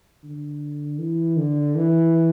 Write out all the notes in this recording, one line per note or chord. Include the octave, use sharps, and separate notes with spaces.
D3
E3
D3
E3